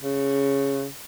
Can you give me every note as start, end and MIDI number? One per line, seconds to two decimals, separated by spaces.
0.02 0.86 49